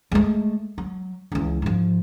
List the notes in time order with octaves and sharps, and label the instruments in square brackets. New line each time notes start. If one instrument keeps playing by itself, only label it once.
[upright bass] G#3 A3
F#3
C#2 E3
G#2 F3